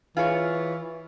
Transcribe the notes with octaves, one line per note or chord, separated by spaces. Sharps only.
E3 F4 G#4 C#5